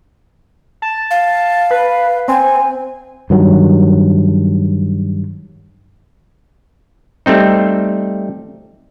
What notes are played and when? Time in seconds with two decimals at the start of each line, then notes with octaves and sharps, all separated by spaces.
0.82 A5
1.11 F5
1.71 B4
2.28 C4 G#5
3.30 G2 D#3 F#3
7.26 G3 A3 C4 D#4